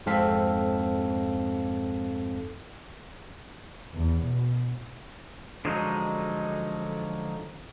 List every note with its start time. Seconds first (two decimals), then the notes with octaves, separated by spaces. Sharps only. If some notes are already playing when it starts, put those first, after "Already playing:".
0.06 F2 G#2 C4 A4 F5 B6
3.95 E2
4.24 B2
5.65 D3 F3 F#3 G#3 D#4